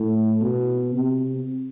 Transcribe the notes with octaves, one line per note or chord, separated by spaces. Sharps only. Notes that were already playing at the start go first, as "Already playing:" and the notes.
Already playing: A2
B2
C3